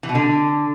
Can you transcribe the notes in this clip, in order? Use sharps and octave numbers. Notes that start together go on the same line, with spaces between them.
E3
B2
D3